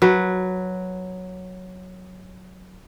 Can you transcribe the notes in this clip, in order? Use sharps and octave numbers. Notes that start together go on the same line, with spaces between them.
F#3 B4